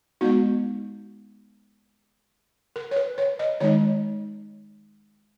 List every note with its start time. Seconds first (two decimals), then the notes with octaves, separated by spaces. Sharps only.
0.21 G#3 B3 D#4 F#4
2.76 A#4
2.91 C#5
2.96 B4
3.18 C#5
3.39 D#5
3.60 D#3 G#3 D#4 C#5